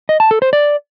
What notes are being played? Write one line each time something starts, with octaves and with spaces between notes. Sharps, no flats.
D#5
A5
A4
C5
D5